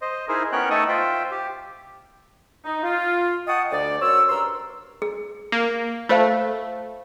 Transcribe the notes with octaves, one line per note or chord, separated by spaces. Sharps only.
C5 D#5
D#4 E4 G#4 A#4 C5
B3 C#4 A#4 C#5 G5 F#6
A3 D#4 A4 D#5 C#6 D#6
F4 C5 E5 G5
G4
D#4
F4
D#5 F#5 G5 A5 C#6 D#6
D2 D5
F#2 C5 C#5 C#6 E6
G2 A#4 C6 E6
G#4
A#3
A3 F4 C5 F5